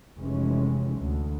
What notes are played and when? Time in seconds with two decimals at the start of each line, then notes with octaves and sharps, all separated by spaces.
0.17 F1 C3 E3 G#3 C#4
0.99 D2